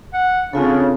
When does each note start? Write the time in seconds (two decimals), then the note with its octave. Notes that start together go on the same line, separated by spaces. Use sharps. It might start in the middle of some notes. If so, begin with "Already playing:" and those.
0.13 F#5
0.53 C#3 C4 D4 F4 A4